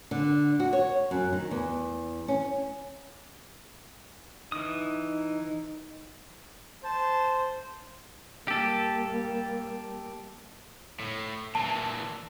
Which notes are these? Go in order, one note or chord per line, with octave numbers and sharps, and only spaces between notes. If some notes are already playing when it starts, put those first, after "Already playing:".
D3
F#4
C#5
F#2
D#3
E2
C#4
E3 D#4 D#6
C5 A5
G3 A#3 G4 A4
A2
A#2 E3 A5